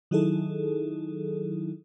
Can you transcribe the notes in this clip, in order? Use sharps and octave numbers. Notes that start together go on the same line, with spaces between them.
D#3 F#3 D#4 E4 G#4 A4